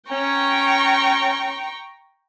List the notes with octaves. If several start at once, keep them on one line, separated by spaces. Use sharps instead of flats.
C#4 G5 A#5 C#6